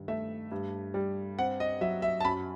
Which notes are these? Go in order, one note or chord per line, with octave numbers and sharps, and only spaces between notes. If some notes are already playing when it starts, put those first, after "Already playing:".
Already playing: G2 D#3
A3 E5
G2
G3
C4 F#5
D#5
F#3 E5
E5
A5
F#2 B5